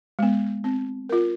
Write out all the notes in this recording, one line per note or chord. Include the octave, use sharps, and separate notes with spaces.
G#3 B3
C4
F4 A#4